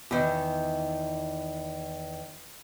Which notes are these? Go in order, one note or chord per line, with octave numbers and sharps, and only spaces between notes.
E2 D#3